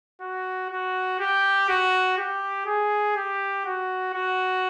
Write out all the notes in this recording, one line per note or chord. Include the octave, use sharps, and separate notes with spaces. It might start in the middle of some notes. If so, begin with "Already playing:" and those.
F#4
F#4
G4
F#4
G4
G#4
G4
F#4
F#4